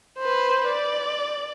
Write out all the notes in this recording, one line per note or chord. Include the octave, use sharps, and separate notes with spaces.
B4 C5
D5